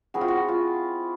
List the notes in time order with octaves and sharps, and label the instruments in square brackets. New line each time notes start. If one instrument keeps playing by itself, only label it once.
[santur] C4 E4 G#4 [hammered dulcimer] F#4
[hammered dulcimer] F4
F#4
F4